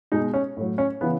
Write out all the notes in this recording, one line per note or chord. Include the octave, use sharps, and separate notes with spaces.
B2 G#3 D#4
C#4
A2 F#3
C#4
C#3 E3 B3